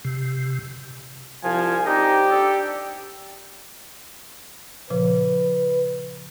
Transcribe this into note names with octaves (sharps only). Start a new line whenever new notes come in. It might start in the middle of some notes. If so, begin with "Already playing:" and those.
C3
C2 F3 G#5
C4 D4 D#4 G4
D4 A4
A#2 C#3 F3 B4